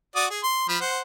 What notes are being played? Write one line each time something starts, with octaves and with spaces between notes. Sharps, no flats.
F#4 D5 D#6
G#4
C6
F3 B5
C5 F#5